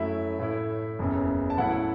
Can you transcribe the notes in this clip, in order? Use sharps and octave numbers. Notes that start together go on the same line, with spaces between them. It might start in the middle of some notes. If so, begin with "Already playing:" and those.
Already playing: F#2 F#3 A3 E4 E5
A2 A3 E4
F#1 E2 C#3
A5
A2 F#3 C#4 E4 F#5